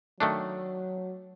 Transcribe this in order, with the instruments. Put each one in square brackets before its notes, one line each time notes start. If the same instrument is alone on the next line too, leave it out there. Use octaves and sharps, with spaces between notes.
[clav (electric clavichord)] D#3 A3 D4 [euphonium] F#3